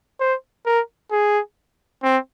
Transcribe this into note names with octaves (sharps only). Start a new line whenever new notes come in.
C5
A#4
G#4
C4